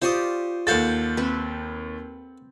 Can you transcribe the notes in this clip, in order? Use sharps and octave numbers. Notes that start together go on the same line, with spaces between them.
F4 G4 C5 D5 C#6 D#6
D#2 A4 F5 F#5 G6 A6
C4 B4